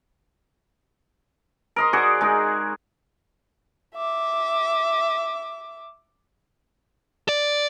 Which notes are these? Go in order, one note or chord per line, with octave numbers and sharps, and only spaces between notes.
A#4 D#5 C6
F#4 G#4 D5
G#3 D#4
E5 D6
D5